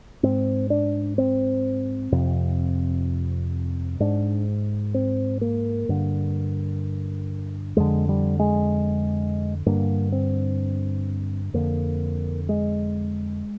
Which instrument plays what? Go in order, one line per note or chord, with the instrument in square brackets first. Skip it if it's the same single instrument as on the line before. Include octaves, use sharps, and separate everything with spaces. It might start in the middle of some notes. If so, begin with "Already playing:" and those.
[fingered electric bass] G#2 C4
D4
C4
F2 C3
G#2 D4
C4
A#3
G2 D3
F2 D3 G#3
G3
G#3
G2 D3 A#3
C4
F2 D3 A#3
G#3